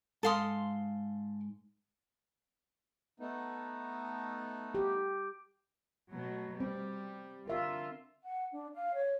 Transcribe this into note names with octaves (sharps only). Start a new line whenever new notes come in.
G#2 A4 F5 C6 D#6
A3 B3 D#4
G4
B2 F#3 A3
G3 C4
D3 F4 A#4 E5 F5
F#5
D4
F5
C#5